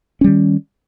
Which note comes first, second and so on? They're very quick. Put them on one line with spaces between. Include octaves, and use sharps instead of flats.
C#4 G3 D#3